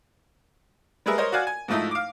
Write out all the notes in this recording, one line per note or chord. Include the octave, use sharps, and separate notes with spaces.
G3 G#3 G#4 A#4 B4 E5
A#4 C5 C#5 D#5
F#4 D5 F5 F#5 G#5
G#5
G#2 F3 A3 D#4 E4
F5 D6